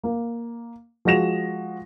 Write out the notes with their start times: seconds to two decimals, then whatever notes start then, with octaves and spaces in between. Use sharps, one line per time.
0.04 A#3
1.05 F3 G#3 F#4 A#6 E7 F7